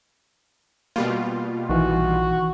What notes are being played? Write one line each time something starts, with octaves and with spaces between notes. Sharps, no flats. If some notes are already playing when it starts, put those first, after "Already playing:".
B2 G3 A#3 F4
A#1 D#3 E3 F#4